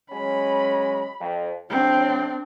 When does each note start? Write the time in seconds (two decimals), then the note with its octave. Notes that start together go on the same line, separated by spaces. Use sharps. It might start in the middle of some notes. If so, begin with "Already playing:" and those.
0.11 F#3 G#3 C#4 B5
1.20 F2
1.70 A2 C3 F#3 C4 D4